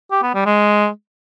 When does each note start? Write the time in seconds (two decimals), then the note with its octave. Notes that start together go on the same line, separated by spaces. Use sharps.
0.11 G4
0.23 B3
0.34 G3
0.46 G#3